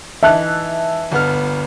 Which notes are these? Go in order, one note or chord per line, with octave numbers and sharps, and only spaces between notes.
E3 D#4 E5 A5 F#6
G1 B3 F6